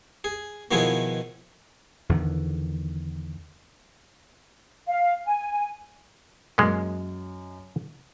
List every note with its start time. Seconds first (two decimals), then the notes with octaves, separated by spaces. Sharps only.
0.24 G#4
0.71 B2 D#3 F3 B3 E4 G#4
2.09 E2 D3 D#3
4.88 F5
5.25 G#5
6.58 F#2 G#3 A#3 D#5